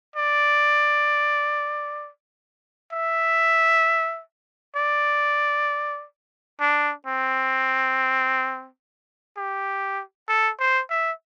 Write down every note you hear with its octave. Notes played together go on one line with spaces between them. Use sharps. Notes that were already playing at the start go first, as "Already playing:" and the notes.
D5
E5
D5
D4
C4
G4
A4
C5
E5